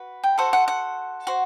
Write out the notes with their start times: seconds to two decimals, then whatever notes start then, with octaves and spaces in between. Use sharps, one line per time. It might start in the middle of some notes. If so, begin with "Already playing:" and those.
Already playing: F#4 B4
0.23 G5
0.38 F#4 A4 C5 F#5
0.53 F#5
0.68 F#5
1.27 F#4 C5